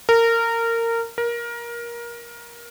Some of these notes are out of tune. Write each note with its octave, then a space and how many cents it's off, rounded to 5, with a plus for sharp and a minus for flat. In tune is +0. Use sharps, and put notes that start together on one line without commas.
A#4 -20
A#4 +20